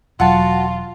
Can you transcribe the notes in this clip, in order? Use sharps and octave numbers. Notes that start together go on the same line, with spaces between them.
E1 F#3 F4 F#4 A5